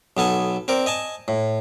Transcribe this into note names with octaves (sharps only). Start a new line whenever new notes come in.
B1 B3 A4 G#5
C4 A#4 D5
D#5 G#5 A5
A2